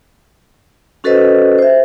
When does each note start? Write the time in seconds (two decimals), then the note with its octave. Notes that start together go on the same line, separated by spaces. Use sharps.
1.04 C#4 F#4 A4 B4 C5 D#5
1.58 C5 E5